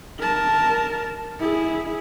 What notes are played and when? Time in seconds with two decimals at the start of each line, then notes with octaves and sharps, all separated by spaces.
0.19 A#4 A5
1.40 E4 G#4